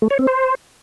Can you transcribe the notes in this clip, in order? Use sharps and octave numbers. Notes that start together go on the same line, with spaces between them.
A3
C#5
C4
C5